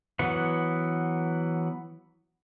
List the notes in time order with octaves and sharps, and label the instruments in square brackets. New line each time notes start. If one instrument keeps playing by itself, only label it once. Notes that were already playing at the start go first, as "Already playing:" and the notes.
[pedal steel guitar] E3 F#3 B3 F#5